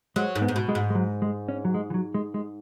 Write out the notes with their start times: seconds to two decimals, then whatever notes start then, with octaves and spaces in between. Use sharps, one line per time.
0.16 F#3 G#3
0.35 G#2
0.42 B3
0.48 G#2
0.56 B2
0.69 G#3
0.75 G#2
0.90 G#3
0.95 F#3
1.22 G#3
1.49 C#4
1.65 F#3
1.74 G#3
1.90 E3
1.94 F#3
2.14 G#3
2.34 G#3